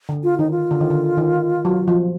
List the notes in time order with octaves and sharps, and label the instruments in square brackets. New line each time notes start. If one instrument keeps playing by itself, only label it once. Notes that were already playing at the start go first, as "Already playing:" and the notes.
[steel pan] D3
[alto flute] F4
[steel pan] D#3 [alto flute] D#4
[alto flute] F4
[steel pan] D3
D#3
D3
D#3
F#3
F3